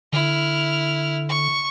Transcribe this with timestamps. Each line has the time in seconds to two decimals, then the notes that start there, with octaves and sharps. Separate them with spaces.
0.13 D3 E4 F6
1.29 C#6